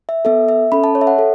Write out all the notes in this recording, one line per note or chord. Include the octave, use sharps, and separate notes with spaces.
E5
B3 A4 E5
E5
C#4 A4 B5
A5
C#5
E5
F#5
A4